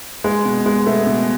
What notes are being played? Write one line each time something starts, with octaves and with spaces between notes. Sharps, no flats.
G#3
B2
G#3
B2 A3
B2